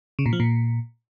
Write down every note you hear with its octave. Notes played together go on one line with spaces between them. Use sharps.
C#3
A#2
F3
A#2